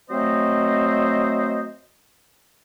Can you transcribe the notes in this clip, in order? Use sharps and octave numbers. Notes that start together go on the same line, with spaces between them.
F#3 A3 C4 C5 D#5